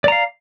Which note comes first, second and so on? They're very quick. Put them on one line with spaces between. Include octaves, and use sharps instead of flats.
D5 A#5 F5